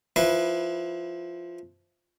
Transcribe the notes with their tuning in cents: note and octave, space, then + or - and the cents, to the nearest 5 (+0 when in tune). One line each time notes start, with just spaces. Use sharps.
F3 +0 E4 +0 B4 -10